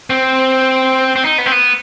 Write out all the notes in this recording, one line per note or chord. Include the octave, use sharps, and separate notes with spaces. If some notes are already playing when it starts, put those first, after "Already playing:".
C4
C4
D#4
B3
C4
B3